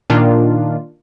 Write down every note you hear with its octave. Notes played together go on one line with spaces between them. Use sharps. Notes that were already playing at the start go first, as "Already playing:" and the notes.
A#2 D#3 D4 F4